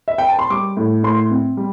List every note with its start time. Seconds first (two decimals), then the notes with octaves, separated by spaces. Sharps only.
0.08 E5
0.18 G5
0.29 A5
0.39 C6
0.50 G3 D6
0.77 A2
1.03 A2 C6
1.30 C4
1.57 G3